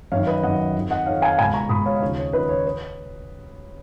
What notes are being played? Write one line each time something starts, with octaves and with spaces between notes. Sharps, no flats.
F#2 D#3 C#5 F5
B4 D#5
F#2 D#3 D#5 F#5
F2 D#3
D#5 F#5
F2 D#3 C#5 F5
F5 G#5
C#2 B2 G#5 B5
A#5 C#6
C#2 B2 B5 D#6
C#5 F5
D#5
D#2 C#3 F3 C#5
C#5
D#2 C#3 F3 B4 D#5
C#5
B4